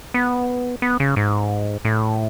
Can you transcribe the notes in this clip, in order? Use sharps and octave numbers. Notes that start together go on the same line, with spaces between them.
B3
B3
C#3
G#2
A2